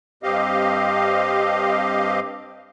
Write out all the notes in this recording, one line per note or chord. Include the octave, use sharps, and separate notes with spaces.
G2 C4 G4 D#5 F5